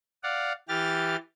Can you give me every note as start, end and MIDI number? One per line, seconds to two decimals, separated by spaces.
0.23 0.53 74
0.23 0.53 77
0.23 0.53 78
0.68 1.16 52
0.68 1.16 67
0.68 1.16 89
0.68 1.16 93